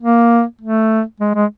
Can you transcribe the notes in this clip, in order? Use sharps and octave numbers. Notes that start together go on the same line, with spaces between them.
A#3
A3
G#3
G#3